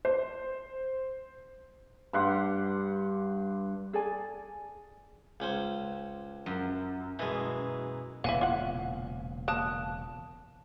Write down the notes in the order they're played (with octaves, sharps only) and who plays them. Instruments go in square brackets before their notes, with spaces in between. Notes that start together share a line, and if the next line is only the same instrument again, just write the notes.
[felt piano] C5
[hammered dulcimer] G2 G4 F#5 C6
[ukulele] G#4 A4 D5 G#5
[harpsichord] C#2 C#4 C5
[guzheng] F#2
[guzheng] B2 [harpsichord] E3 G#3
[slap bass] E1 A#2 C#3 [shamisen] B3 E4 [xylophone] F5 G#5
[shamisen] F4 F#5
[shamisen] A#3 [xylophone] A5 D#6 F#6